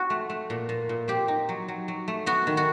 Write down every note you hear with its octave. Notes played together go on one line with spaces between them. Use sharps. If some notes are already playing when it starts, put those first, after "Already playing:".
Already playing: C4 F#4
A3
A3
A#2
A#2
A#2
C4 G4
D#4
F#3
F#3
F#3
A3
B3 F#4
D#3
F#4